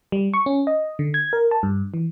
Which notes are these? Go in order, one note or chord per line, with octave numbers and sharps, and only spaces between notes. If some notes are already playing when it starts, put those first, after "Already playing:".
G3
C#6
C#4
D#5
D3
G#6
A#4
A5
G2
E3